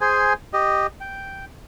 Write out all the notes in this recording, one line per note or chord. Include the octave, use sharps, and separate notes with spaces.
G#4 C5 G#5
G4 D#5
G5